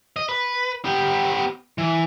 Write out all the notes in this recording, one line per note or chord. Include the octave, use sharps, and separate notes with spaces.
D#5
B4
B3 G4
E3